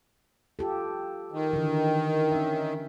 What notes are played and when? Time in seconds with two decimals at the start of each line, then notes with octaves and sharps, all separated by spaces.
0.59 F4 G4 A4
1.32 D#3
1.53 D3 E3
2.31 C#4 E5